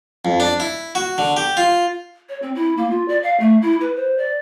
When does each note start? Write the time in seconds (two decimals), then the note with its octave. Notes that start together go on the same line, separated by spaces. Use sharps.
0.25 F2
0.40 D4
0.60 E4
0.95 F#4
1.18 D3
1.37 G4
1.57 F4
2.29 C#5
2.42 C4
2.55 E4
2.77 A#3
2.90 F4
3.08 D5
3.23 F5
3.40 A3
3.62 E4
3.81 B4
3.96 C5
4.18 D5